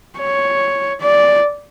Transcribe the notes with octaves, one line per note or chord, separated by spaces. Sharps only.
C#5
D5